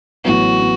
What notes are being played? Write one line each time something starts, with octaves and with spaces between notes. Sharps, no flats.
A1 A2 F#3 B3 F#4
B3